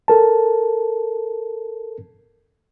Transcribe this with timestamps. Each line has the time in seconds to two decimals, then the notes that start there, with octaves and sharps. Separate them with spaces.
0.08 A4 A#4 A5